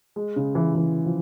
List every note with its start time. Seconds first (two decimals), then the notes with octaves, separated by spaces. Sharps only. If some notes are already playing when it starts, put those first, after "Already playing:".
0.16 G#3
0.36 C#3
0.55 E3
0.75 E3
1.06 F3